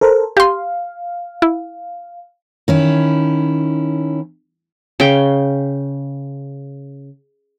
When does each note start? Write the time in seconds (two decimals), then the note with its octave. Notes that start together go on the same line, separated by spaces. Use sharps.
0.01 A4 A#4 C5
0.37 G4 F5 C6
1.42 E4
2.68 D#3 C#4 E4
5.00 C#3 G5